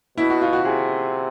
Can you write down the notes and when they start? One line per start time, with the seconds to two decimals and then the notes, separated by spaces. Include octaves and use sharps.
0.18 B2 E4
0.30 F#4
0.42 F4
0.53 F#4
0.64 C3 G#4